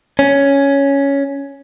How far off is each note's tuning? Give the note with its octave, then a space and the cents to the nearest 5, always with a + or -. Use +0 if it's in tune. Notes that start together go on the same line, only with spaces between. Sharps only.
C#4 +5